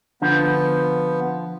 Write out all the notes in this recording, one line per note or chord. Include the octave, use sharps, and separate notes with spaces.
D3 F3 B3